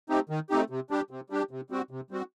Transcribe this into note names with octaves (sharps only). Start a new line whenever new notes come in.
A3 C4 D#4 G4
D#3
A3 C4 D#4 G4
C3
G3 D4 G4
C3
G3 D4 G4
C3
G3 C4 F#4
C3
G3 C4 F#4